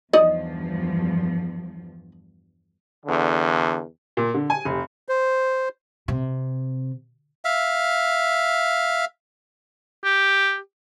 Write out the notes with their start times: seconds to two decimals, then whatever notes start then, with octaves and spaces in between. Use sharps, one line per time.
0.13 E2 G2 F3 D#4 D5 D#5
3.05 E2 D3
4.17 A#2
4.34 D3
4.50 G#5
4.65 F1
5.09 C5
6.08 C3
7.45 E5 F5
10.04 G4